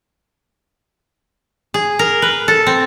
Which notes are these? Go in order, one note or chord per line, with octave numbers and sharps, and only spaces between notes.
G#4
A#4
B4
A4
C4